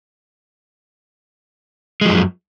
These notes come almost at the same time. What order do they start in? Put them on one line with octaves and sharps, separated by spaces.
G#3 F3 F#2